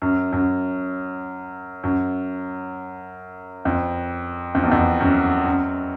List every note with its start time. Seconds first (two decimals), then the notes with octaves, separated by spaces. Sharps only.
0.02 F#2
0.32 F#2
1.83 F#2
3.65 F2
4.55 F2
4.63 E2
4.71 F2
5.01 F#2
5.46 F#2